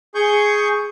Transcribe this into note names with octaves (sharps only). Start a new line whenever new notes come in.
G#4 C#6 G6